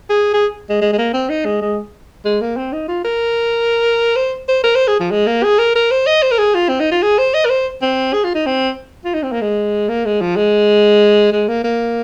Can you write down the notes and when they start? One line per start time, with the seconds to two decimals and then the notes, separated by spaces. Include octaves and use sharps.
0.10 G#4
0.34 G#4
0.70 G#3
0.82 G#3
0.93 G#3
0.98 A#3
1.13 C4
1.29 D#4
1.45 G#3
1.62 G#3
2.25 G#3
2.41 A#3
2.57 C4
2.73 D#4
2.88 F4
3.04 A#4
4.16 C5
4.48 C5
4.64 A#4
4.75 C5
4.88 G#4
5.00 F3
5.11 G#3
5.27 A#3
5.44 G#4
5.59 A#4
5.76 A#4
5.91 C5
6.07 D#5
6.23 C5
6.31 A#4
6.38 G#4
6.55 F4
6.69 C4
6.80 D#4
6.92 F4
7.03 G#4
7.18 C5
7.34 D#5
7.46 A#4
7.50 C5
7.82 C4
8.13 G#4
8.24 F4
8.35 D#4
8.46 C4
9.05 F4
9.14 D#4
9.23 C4
9.32 A#3
9.41 G#3
9.89 A#3
10.05 G#3
10.21 F3
10.37 G#3
11.32 G#3
11.48 A#3
11.64 A#3